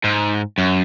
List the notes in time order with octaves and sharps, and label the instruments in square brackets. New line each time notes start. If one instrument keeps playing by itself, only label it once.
[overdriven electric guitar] G#2
F#2